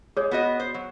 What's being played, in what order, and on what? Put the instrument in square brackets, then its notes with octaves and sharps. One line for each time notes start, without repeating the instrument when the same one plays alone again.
[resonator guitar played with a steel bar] G#3 [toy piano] G#4 C#5
[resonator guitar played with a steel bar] B3 F#4 D#5
C5
F#3